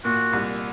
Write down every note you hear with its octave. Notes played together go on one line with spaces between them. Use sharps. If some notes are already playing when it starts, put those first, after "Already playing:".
A#2 F#4
C2